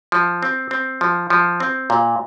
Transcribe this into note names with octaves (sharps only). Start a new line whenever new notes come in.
F3
C4
C4
F3
F3
C4
A#2